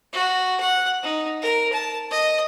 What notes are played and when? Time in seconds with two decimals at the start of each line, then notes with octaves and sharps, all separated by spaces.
0.13 F#4
0.60 F#5
1.03 D#4
1.42 A#4
1.73 A5
2.11 D#5